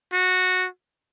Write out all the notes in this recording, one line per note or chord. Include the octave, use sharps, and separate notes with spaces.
F#4